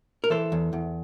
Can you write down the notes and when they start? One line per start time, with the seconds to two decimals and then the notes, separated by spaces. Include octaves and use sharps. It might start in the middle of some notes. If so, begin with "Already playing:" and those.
0.24 A#4
0.30 E3 A4 C5
0.52 E2
0.73 E2